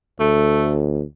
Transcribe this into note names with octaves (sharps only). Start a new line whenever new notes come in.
D2 A3